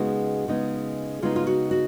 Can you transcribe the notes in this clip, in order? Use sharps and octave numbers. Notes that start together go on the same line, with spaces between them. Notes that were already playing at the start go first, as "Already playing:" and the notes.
Already playing: C#3 G#3 B3 D#4 F#4
C#3 G#3 B3 D#4
C#3 G#3 B3 D#4 F4
F4
F#4
F#4